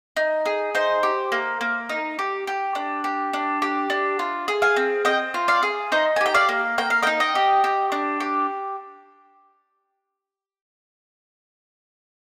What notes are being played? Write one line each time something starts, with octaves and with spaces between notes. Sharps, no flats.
D#4
G#4
D#4 C5
G4
A#3
A#3
D#4
G4
G4
D4
G4
D4
G4
D4
F4
G#4
F5 G#5
C4
C4 D#5 G5
F4
D5 F5
G#4
D#4 C5 D#5
G#5
G4
G5
D5 F5
A#3
A#3 G5
F5
D#5 G5
D#4
D#5 G5
G4
G4
D4
G4